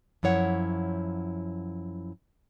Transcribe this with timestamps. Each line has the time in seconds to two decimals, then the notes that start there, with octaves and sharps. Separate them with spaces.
0.23 F#2 F3 E4 C#5 F#5